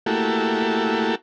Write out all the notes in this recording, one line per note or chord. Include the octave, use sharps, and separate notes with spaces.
A3 A#3 E4 F#4 G4 A4